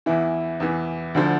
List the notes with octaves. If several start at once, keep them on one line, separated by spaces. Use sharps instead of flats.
E2 E3 E4
E2 E3
D2 D3 F3